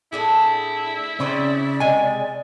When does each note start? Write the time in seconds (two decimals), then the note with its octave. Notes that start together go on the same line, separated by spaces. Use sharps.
0.12 A2 D4 E4 G#4
1.20 C#3 C4 C#4 C5 D5
1.80 C3 G#3 G#5